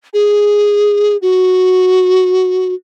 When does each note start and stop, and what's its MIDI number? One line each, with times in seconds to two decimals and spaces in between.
0.14 1.17 68
1.22 2.74 66